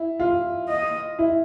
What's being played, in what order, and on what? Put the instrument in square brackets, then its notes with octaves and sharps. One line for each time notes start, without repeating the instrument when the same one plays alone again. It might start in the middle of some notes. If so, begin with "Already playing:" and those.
Already playing: [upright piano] E4
F4
[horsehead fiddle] D#5
[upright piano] E4